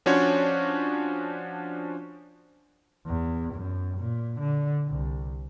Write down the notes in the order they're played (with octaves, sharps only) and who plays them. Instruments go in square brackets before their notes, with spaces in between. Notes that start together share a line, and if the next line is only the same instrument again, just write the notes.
[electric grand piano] F3 C#4 D4 F#4 C5 C#5
[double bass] E2
F#2
A#2
D3
C2